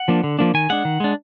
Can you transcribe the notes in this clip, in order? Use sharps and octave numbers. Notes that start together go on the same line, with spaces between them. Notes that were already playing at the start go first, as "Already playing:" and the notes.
Already playing: F#5
F3 A#3 D4
D3
F3 A#3 D4
D#3 G#5
G#3 D4 F#5
D#3
G#3 D4